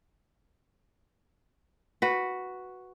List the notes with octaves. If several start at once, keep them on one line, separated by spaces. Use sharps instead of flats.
F#4 B4